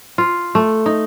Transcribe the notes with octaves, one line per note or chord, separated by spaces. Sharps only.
F4
A3
D#4